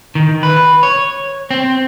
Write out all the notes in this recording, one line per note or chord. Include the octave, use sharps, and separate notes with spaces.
D#3
B4
C#5
C4